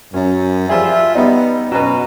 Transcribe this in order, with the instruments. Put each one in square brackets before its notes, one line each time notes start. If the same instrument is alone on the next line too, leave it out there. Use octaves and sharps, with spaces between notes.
[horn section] F#2 [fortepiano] C#4
[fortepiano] F3 G3 G#4 [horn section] F4 E5
[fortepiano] G3 D#4 [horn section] B3
[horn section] F#2 F#4 A#5 [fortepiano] B2 C#4 B4